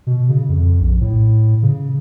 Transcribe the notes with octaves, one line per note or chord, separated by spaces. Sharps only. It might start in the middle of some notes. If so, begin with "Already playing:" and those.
B2
C#3
F2
A#1
A2
C#3